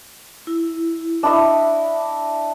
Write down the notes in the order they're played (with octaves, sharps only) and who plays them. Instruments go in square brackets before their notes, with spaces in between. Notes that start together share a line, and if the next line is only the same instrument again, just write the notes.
[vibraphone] E4
[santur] D4 E4 D#5 [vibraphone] E5